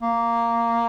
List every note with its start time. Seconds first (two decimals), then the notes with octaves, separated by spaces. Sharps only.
0.01 A#3